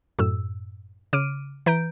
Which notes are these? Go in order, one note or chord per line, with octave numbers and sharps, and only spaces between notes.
F#2 A2 E6
C#3 D6 F6 D7 D#7
E3 B4 A#5 G6 D7